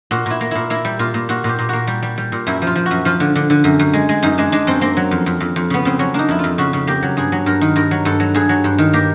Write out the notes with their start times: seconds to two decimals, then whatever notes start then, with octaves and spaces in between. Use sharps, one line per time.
0.11 A#2 F#4
0.26 A#2 E4
0.41 A#3
0.51 A#2 E4
0.70 A#3 E4
0.85 G3
0.99 A#2 F4
1.14 A#2
1.29 A#2 F#4
1.44 A#2 G4
1.59 A#2
1.69 A#3 F#4
1.87 G3
2.03 G3
2.18 G3
2.32 A#2
2.47 F#2 E4
2.62 F3
2.67 F4
2.76 F3
2.86 F#2 F#4
3.05 F3 F4
3.20 D3
3.35 D3
3.50 D3
3.64 F#2
3.79 F#2
3.93 G#3
4.09 G#3
4.23 F#2 D#4
4.38 G#3 D4
4.52 G#3 D4
4.67 F#2 C4
4.81 A#3 C4
4.97 F#3
5.11 F2
5.26 F2
5.40 F2
5.56 F2
5.70 C#3 B3
5.85 C#3 C4
5.99 F#3 C#4
6.14 A#3 D4 D#4
6.29 F2 E4
6.39 F2 F4
6.58 C#3 F#4
6.73 C#3
6.87 A#3 G4
7.03 F#3
7.17 G2 G#4
7.32 F#3
7.46 G2 A#4
7.61 D#3
7.76 G2 A#4
7.91 F#3
8.05 G2 A4
8.20 F#3
8.35 G2 G#4
8.49 F#3
8.64 G2
8.78 D#3
8.93 A#3 G4